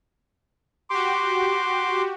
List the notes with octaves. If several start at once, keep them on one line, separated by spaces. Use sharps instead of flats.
F#4 G4 C6 D6